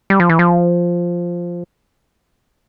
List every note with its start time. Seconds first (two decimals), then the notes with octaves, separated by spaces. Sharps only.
0.10 G3
0.20 F3
0.29 E3
0.39 F3